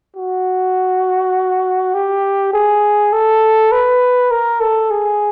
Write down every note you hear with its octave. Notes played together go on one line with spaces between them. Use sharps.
F#4
G4
G#4
A4
B4
A#4
A4
G#4